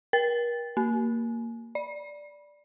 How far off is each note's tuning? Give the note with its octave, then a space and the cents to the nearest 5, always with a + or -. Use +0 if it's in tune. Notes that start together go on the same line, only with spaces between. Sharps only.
A#4 +40
A#3 -15
D5 +0